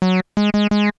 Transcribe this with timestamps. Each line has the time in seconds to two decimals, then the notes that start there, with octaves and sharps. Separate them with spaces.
0.02 F#3
0.37 G#3
0.54 G#3
0.71 G#3